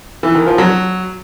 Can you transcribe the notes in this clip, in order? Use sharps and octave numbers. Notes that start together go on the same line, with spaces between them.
E3
D#3
F3
F#3